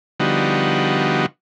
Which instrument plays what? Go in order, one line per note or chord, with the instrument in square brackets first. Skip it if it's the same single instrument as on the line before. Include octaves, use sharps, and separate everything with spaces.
[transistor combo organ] D3 F3 G3 B3 D#4 F#4